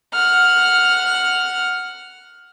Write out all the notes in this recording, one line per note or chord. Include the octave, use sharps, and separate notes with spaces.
F#5 F6